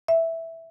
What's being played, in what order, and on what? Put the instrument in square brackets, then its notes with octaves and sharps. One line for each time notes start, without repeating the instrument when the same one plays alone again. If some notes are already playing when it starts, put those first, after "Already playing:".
[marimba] E5